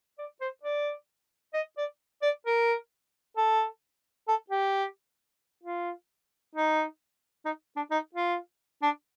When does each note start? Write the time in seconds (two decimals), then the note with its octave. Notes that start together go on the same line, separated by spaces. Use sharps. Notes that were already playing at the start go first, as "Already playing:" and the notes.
0.19 D5
0.41 C5
0.64 D5
1.54 D#5
1.78 D5
2.22 D5
2.46 A#4
3.37 A4
4.28 A4
4.50 G4
5.63 F4
6.55 D#4
7.46 D#4
7.77 D4
7.91 D#4
8.15 F4
8.82 D4